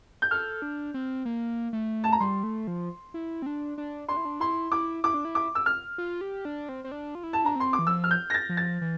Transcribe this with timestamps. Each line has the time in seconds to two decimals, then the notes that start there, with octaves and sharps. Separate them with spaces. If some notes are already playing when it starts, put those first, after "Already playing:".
0.22 G6
0.31 A4 F6
0.62 D4
0.94 C4
1.25 A#3
1.73 A3
2.04 A5
2.12 A#5
2.20 G3 C6
2.43 A3
2.67 F3
3.14 E4
3.42 C4
3.46 D4
3.78 D4
4.08 D4 C6
4.17 E4
4.25 D4
4.40 E4 C6
4.72 E4 D6
5.04 E4 D6
5.14 D4
5.25 E4
5.35 D6
5.55 E6
5.66 F6
5.98 F4
6.21 G4
6.45 D4
6.69 C4
6.84 C4
6.92 D4
7.15 F4
7.23 E4
7.33 A5
7.45 D4 A#5
7.56 C4 C6
7.73 D6
7.79 E3
7.87 F3 E6
8.04 F6
8.11 G6
8.30 A#6
8.34 A6
8.49 F3
8.57 A6
8.81 E3